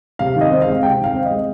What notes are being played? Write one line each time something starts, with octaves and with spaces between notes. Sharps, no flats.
C3 F5
D#3
D#5
C4
G#3 F5
C3 G5
D#3 F5
C4
G#3 D#5